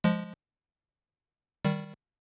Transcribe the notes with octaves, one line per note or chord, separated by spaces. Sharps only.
F3 G#3
D#3 G3